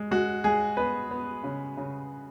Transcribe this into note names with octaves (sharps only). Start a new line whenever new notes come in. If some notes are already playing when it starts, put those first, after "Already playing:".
Already playing: G#3
G#3 F#4
G#3 G#4
B3 B4
B3
C#3
C#3